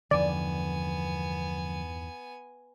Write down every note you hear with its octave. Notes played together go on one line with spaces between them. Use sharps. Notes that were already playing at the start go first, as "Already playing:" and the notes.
E2 G2 D3 D#3 F3 B3 D5 G#5